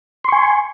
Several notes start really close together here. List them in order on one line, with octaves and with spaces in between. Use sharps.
C6 C#6 G#5